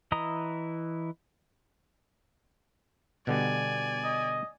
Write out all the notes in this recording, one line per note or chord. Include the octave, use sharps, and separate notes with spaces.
E3 E4 D#5 A#5 D#6
B2 D3 G3 D5 G#5
D#5